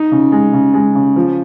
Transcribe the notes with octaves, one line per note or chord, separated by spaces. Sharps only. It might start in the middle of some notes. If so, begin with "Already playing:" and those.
Already playing: D#4
C#3
G#3
C#3
G#3
C#3
F3